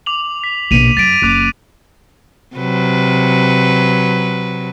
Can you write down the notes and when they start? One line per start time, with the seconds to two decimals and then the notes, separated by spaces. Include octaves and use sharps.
0.06 D6 F7 F#7
0.44 B6
0.71 A#1 B2 B6 D#7 F7
0.97 F#2 A6 B6 D7
1.22 F#1 D6 F#6 D7
2.56 C3 F#3 B4